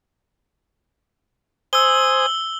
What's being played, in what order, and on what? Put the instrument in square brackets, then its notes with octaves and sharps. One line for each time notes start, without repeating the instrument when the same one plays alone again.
[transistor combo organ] C5 G#5 D#6 [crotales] E6 G7